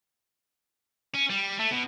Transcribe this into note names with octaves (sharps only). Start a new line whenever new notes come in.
C#4
G3
A3
B2